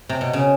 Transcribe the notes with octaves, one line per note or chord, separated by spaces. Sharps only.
C3
B2
C#3